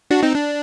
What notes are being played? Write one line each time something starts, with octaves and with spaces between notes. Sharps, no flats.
D4 F#4
C4 D#4
D4